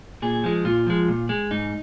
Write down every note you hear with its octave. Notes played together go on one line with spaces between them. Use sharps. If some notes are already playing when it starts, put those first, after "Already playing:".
A#2 G#4
F3 G#3
A#2 F4
F3 G#3
A#2
G#3
G#2 D#4